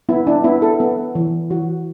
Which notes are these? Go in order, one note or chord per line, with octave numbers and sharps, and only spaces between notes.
B3 E4
D4
B3 E4
A4
B3
E3
E3 F#4